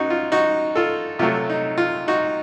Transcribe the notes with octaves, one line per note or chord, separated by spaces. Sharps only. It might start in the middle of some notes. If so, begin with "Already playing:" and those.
Already playing: F#2 D#4 F#4
F4
D#4 F#4
F4 A4
C3 F#3 A3 F4
D#4
F4
D#4 F#4